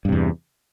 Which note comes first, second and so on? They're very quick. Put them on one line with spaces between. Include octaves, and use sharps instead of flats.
G2 C3 E2